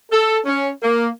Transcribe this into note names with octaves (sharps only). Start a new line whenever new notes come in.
A4
C#4
A#3